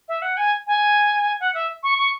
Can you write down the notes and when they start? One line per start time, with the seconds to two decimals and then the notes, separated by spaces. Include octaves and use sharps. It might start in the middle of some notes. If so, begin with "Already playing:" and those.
0.08 E5
0.22 F#5
0.37 G#5
0.67 G#5
1.40 F#5
1.54 E5
1.83 C#6
1.98 C#6